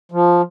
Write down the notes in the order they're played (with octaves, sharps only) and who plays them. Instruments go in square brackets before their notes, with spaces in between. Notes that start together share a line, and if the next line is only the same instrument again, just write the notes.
[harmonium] F3